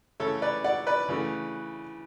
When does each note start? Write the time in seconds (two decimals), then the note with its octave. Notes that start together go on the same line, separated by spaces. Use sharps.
0.20 C#3 E3 A3 A4 C#5
0.42 B4 D5
0.64 D5 F#5
0.87 B4 D5
1.09 C#3 E3 A3